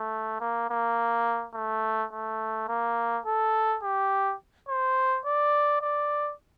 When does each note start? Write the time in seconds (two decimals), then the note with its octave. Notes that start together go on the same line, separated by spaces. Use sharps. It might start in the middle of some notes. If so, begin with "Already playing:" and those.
Already playing: A3
0.40 A#3
0.70 A#3
1.54 A3
2.12 A3
2.68 A#3
3.26 A4
3.83 G4
4.68 C5
5.25 D5
5.81 D5